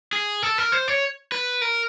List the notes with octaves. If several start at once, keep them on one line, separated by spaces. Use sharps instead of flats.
G#4
A4
A#4
C5
C#5
B4
A#4